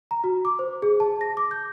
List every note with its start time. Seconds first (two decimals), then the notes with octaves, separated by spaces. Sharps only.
0.11 A#5
0.24 F#4
0.45 D6
0.59 C5
0.82 G#4
1.00 A5
1.21 A#6
1.37 D6
1.51 G6